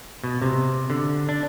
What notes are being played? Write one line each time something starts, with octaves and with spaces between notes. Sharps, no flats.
B2
C3
D3
D4